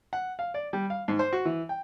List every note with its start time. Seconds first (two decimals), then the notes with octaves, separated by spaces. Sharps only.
0.13 F#5
0.39 F5
0.54 D5
0.73 G3
0.90 F5
1.08 G#2
1.19 C5
1.33 F#4
1.45 E3
1.69 G5